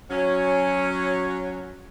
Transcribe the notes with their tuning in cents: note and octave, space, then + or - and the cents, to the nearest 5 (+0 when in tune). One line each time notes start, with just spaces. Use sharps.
F#3 -10 C#4 +0